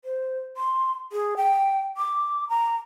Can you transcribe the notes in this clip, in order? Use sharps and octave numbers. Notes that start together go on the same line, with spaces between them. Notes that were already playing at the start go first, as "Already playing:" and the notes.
C5
C6
G#4
G5
D6
A#5